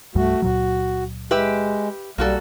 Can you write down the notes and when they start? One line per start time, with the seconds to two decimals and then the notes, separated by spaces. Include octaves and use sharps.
0.15 C2 G2 G3 A3 F#4
0.42 C#2 A#2 F#3 F#4
1.31 G#3 G4 B4 E5
2.18 B1 G3 A#3 F#4 A4